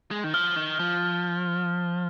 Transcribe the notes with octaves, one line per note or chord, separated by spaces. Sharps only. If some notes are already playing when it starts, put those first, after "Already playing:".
G#3
D#3
F3 F6
D#3
F3